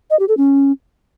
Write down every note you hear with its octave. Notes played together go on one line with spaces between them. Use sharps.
D#5
G4
A4
C#4